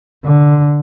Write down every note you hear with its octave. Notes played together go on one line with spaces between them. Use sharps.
D3